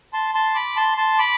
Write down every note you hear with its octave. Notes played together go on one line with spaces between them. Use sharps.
A5 C6
A5 C6
B5 D6
A5 C6
A5 C6
B5 D6